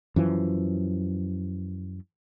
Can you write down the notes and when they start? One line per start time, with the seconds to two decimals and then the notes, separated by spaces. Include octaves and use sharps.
0.16 F#2 E3 F3